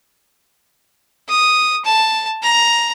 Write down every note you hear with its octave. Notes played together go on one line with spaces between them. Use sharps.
D#6
A5
A#5